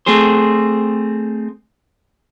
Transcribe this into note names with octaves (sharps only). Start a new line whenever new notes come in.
A3 C4 G#4 C5